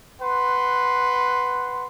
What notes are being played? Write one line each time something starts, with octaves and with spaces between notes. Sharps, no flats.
B4 F#5 C6